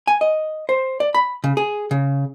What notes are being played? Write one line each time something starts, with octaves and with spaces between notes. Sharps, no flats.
G#5
D#5
C5
D5
B5
C#3
G#4
C#3